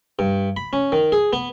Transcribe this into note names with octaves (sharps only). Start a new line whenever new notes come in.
G2
B5
C#4
D#3
G#4
B3